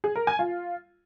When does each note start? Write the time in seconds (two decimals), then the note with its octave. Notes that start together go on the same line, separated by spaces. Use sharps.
0.04 G#4
0.16 A#4
0.27 G#5
0.39 F4